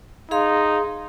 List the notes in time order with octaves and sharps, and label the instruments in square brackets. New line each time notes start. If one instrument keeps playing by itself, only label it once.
[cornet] D#4 [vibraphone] G#4 F5 C6